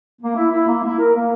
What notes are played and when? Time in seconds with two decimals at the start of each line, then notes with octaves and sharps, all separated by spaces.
0.21 A#3
0.35 E4
0.51 E4
0.67 A#3
0.82 E4
0.97 A#4
1.13 A#3